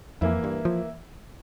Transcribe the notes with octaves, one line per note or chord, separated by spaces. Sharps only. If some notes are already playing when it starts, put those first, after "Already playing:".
F2 E3 A#3 E4
G2
F3